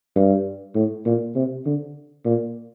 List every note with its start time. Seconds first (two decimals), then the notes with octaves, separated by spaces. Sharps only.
0.16 G2
0.75 A2
1.06 A#2
1.36 C3
1.66 D3
2.26 A#2